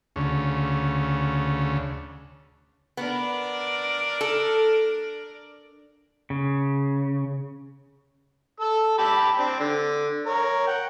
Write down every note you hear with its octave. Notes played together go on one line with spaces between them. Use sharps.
D2 C#3
B3 D4 A#4 D5
A4
C#3
A4 E6
G4 A5 B5
C4 D4
D3
A#4 C#5
F#5 G5